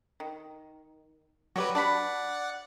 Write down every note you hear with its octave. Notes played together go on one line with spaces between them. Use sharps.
D#3
F#3 F#4 G4 B4 C#5 D5
D4 F#4 D5 F#5 B5